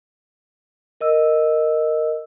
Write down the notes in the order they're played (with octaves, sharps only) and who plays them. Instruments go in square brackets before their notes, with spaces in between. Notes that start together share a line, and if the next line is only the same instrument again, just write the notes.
[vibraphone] A#4 D#5 E6